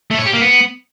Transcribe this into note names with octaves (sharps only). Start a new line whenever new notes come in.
A3
C#5
G4
A#3
B3